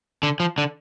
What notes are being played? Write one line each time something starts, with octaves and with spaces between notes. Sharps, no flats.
D3
F3
D3